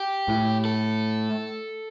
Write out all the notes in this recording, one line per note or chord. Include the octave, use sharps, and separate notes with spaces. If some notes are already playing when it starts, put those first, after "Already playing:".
Already playing: G4
A2
A4